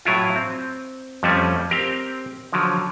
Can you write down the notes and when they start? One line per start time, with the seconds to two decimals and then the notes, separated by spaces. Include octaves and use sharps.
0.05 A2 F#3 E4 F4
0.36 C4
1.23 F2 F3 G3 A3 C#4
1.70 C4 G4 A#4
2.53 D3 F3 F#3